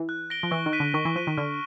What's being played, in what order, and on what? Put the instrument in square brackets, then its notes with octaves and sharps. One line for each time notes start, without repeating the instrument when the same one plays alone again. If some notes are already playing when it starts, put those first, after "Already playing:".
Already playing: [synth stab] E3
[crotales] F#6
A#6 D7 G7
[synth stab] F3
[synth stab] E3 [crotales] C#6
[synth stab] D#3
[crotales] F#6 B6 D#7
[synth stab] D3
[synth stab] D#3 [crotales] C#6
[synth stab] E3
[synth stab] F3 [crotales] F#6 B6 D#7
[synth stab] D#3
[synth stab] D3 [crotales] F6